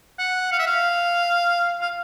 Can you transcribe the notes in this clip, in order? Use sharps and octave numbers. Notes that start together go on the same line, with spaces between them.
F#5
F5
E5
F5
F5